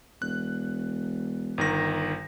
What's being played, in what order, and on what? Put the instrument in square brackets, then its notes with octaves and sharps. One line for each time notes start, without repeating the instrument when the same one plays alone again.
[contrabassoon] E1 [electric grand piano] F#6
[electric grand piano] G1 D#3 A#6